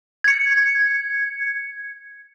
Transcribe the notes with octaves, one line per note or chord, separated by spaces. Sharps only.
G#6 C#7